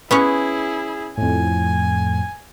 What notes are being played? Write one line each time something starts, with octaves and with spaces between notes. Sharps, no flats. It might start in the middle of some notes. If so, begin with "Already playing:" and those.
B3 C#4 E4 G#4 C#5
F2 A2 G#5